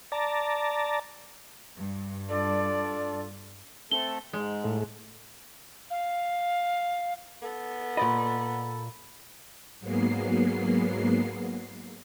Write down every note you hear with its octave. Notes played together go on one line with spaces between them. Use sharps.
D5 A5 A#5
G2
D4 F4 A4 D5
A3 C4 A4 G7
G#2 G#3
A2
F5
B3 A4
A#2 D5 D#5 B5
G#2 F#3 G#3 A#3 B3 C7